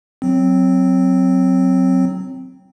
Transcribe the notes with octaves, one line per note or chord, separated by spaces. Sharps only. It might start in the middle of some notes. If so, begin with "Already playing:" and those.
F#3 C4